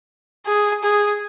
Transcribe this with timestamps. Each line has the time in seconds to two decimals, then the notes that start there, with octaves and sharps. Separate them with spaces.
0.46 G#4
0.83 G#4